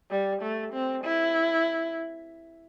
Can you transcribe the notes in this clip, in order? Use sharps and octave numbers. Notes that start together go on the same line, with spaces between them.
G3
A3
C4
E4